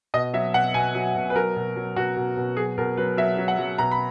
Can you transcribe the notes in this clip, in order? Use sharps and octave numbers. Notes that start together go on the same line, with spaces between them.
B2 D#5
F#3 E5
B2 F#5
B2 G#5
F#3
B2
B4
F#3 A#4
B2
F#3
B2 F#4
B2
B2
F#3 G#4
B2 A#4
F#3 B4
F#3 E5
F#3
F#5
F#3
B2 A#5
B5